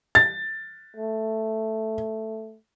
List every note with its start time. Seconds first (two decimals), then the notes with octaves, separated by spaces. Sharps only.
0.15 A6
0.96 A3